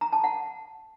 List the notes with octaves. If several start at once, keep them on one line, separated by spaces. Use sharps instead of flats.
A#5
A5
F#5